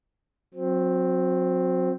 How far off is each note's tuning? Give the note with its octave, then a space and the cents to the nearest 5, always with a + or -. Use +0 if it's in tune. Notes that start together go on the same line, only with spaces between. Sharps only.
F#3 -30 C4 +0